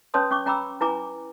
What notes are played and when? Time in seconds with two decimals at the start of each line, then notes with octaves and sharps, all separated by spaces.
0.14 C#4 B4 C#5 A5 C6 D#6
0.30 C#4 C#6 D6
0.46 C#4 G5 A#5 B5 D6 E6
0.81 E4 B4 G#5 A#5 D6